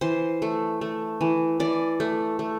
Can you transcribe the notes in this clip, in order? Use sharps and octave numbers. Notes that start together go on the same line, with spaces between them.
E3 C5
A3
A3
E3
E3 D5
A3
A3